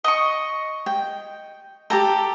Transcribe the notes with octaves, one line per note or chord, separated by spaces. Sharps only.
D#5 C#6
G5
G4 A4 G5 A#5